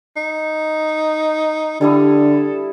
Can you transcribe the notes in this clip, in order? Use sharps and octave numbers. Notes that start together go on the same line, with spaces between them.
D#4
D3 G3 E4 A4 D#6